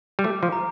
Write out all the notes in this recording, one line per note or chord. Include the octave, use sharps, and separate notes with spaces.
G3
A3 D6
F3
A#5